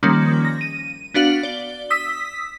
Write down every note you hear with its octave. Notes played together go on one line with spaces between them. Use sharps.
D#3 F3 G3 A#3 C#4
A#6
D#7
B3 D4 F#4 F5 F#7
D5 G7
D#6 E6 B6